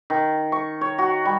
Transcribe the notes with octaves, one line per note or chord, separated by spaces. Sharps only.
D#3
C#6
C#5
F#4
G3